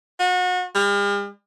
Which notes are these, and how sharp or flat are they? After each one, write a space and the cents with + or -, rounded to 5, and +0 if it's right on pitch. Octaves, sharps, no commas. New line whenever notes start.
F#4 -30
G3 +45